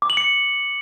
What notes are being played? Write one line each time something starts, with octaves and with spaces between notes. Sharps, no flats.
D6
F#7
C#7